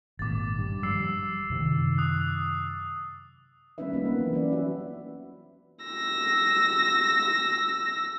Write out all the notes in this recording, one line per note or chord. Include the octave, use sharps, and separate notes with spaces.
G#1 A#2 D6 A6
G2
F3 G3 E6 C7
F#2 C3 D#3
D#6 F#6
G3 B3 C#4 D#4 B4 E5
A#3 B3 F4
A#3 C4 F4 B4
E3 F#3
C#4 G4 B4 D5
F#4 E5
E6 A#6